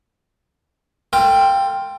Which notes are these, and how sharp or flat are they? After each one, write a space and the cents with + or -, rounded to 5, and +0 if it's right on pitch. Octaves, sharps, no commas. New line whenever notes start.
F4 +0 A4 +40 G5 +5